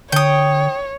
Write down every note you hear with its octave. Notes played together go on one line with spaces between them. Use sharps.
D3 C#5 G5 D#6